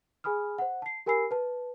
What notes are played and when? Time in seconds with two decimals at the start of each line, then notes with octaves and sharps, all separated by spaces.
0.24 G#4 G#5 B5 D#6 F6
0.58 C5 F#5
0.82 A5 C7
1.06 G4 A#4 G#5 B5 E6 C7
1.31 B4 A5